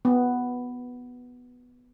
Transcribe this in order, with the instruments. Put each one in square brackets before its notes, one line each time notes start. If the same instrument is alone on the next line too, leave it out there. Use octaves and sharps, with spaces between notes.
[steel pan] B3